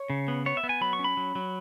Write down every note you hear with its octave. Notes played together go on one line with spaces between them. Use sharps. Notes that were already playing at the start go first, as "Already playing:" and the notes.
Already playing: C#5
C#3
B3
B3 C#5
E5
B3
G#5
F#3 B5
C#6
C#4
B5
F#3
F#3